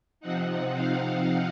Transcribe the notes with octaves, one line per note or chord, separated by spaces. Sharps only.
C3 F3 C4 D#4 F#5
F5